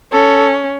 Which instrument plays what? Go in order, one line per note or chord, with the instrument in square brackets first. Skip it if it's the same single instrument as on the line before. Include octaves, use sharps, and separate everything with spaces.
[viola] C#4 [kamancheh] A4